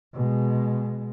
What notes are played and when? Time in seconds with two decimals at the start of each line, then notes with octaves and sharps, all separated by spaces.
0.14 B2 G#3